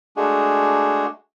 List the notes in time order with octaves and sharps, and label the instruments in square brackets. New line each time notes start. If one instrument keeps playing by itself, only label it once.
[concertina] G#3 A3 D4 F#4 G#4